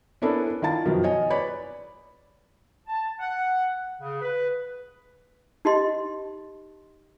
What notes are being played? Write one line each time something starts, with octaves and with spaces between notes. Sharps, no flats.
B3 C#4 D4 E4 A4 A#4
D#3 E4 F4 A5 A6
F#2 B2 D#3 F3
C#5 D#5 G#5
B4 C#5 D5 B5
A5
F#5
C#3
B4
D#4 G4 D#5 C6